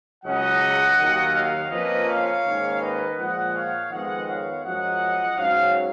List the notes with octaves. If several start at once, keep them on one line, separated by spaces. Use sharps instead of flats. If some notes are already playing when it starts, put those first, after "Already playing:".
C#2 C#3 F#3 C#4 D#5 F#5
D#2 D#3 F#3
C#5 F5
F2 F3 A#3 C#4 B4 D#5
C#5 F5
G#2 D#3 A#3 C#4
B4 D#5
A#2 F3 G#3 D#5 F#5
C#5 F5
F2 D#3 G#3 B3 D#5 F#5
C#5 F5
F#2 F3 G#3 D#5 F#5
G#2 F#3 C#4 C#5 F5